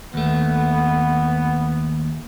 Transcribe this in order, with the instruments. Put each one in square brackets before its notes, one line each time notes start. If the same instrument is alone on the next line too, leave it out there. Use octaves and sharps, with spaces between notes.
[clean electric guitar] D#2 A3 [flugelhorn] B3